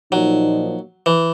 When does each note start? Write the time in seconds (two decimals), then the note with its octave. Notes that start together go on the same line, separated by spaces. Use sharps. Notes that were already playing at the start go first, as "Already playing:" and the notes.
0.12 A#2 F3 F#3 A#3 D#4
1.06 E3